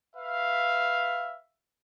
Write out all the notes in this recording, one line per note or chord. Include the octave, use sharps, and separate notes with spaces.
B4 E5 F5